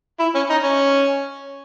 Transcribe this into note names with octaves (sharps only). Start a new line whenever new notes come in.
E4
C#4
D#4
C#4